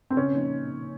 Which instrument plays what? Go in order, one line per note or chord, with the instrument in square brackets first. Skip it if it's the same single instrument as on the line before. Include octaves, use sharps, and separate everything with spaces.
[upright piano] C4
[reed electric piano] C#3 [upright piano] C#4
[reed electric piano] F3 A#3 D#4